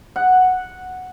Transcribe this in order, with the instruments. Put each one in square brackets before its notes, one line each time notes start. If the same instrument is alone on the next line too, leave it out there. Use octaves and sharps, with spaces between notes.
[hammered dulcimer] F#5